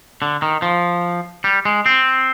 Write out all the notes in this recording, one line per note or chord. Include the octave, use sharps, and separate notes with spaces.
D3
D#3
F3
G3
G#3
C4